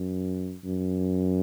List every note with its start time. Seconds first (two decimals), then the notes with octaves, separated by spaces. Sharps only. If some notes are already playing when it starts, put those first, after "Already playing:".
Already playing: F#2
0.65 F#2